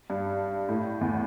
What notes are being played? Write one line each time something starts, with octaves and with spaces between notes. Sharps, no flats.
G2
A2
E2